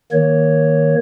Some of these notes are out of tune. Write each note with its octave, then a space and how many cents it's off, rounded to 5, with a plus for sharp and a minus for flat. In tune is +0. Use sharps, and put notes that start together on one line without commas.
D#3 +10 A#3 +0 C#5 +0